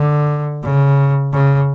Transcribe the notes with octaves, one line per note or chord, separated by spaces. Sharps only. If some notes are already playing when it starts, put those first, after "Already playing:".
Already playing: D3
C#3
C#3